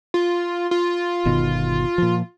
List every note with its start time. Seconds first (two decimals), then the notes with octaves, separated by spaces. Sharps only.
0.14 F4
0.71 F4
1.25 G1 B2 D#3
1.98 A#2 F3